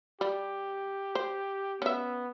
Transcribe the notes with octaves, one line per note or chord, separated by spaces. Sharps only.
G3 G4
C5
B3 C#4 E5